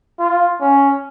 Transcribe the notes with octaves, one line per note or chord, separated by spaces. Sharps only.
F4
C#4